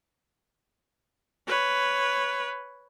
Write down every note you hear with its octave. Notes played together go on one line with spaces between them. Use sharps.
B4 C#5